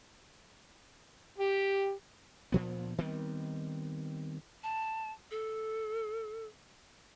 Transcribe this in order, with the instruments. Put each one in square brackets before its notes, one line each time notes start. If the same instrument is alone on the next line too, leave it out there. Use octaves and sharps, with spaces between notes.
[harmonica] G4
[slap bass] D2 A#2 F3 B3
D#3 G3 B3 C4
[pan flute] A5
A4